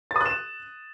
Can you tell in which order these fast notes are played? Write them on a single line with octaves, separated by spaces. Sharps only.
A6 D#6 F#6 E7